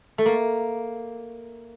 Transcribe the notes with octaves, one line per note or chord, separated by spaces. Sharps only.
A3
A#3